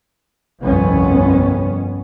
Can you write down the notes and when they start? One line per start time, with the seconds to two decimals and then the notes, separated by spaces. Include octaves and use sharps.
0.63 G1 C2 F2 B3 C#4